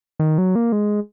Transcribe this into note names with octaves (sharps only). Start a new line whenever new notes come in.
D#3
F#3
A#3
G#3